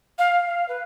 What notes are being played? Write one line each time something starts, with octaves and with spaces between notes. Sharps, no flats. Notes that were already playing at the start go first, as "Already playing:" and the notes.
F5
F5
B4